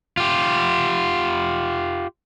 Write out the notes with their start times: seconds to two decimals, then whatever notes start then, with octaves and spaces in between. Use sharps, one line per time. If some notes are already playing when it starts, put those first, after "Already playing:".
0.17 F4 G4